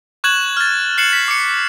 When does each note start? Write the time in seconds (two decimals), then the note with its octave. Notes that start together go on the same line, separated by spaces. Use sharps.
0.24 C#6 F#6 G#6 E7 F#7
0.57 F6 A6
0.98 F#6 C7 C#7 E7 F#7
1.13 B6
1.28 D6 C#7